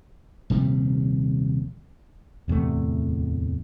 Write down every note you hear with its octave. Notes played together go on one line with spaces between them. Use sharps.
D#1 C3 F3 G3
D1 E2 C3 A3